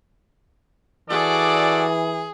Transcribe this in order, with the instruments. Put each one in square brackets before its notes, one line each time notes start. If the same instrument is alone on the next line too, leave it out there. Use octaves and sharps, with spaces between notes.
[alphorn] E3 [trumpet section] F#4 A4 D5 [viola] G#4